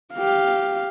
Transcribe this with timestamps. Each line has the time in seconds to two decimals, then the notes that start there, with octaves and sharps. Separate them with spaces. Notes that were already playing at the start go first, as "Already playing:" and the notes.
0.14 G4 F5